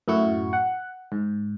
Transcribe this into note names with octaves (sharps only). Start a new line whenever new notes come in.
F#2 A2 A3 E4 F#4 C#6
F#5
G#2